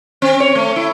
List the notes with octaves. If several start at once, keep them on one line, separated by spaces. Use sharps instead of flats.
C4
C#5
A3
E4